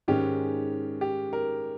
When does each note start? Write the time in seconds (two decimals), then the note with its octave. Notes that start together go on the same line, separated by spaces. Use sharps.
0.08 G#2 D#3 G#3 C#4 G4
1.01 G4
1.33 A#4